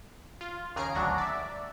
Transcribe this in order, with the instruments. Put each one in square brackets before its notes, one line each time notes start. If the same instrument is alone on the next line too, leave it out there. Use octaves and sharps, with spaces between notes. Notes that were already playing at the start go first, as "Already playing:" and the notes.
[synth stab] F4
D#2 C#3 G#4 A#5 C7 D7
G#1 D2 F#3 D4 F#4 A#5
D5 E5